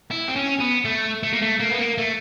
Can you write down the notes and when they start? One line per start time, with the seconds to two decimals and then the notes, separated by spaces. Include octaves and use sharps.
0.11 E4
0.28 C4
0.36 C#4
0.60 B3
0.85 A3
1.23 A3
1.33 A#3
1.42 A3
1.60 A#3
1.71 B3
1.79 A#3
1.98 A3